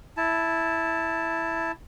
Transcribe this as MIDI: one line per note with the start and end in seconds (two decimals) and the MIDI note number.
0.17 1.72 64
0.17 1.72 81